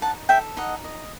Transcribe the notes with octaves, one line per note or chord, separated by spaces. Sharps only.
D#4 F#5 A5
A4 E5 G5
D#4 D#5 F#5
D#5